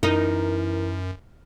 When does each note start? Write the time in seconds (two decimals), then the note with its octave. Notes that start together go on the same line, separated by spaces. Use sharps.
0.03 F#2 E3 D#4 A#4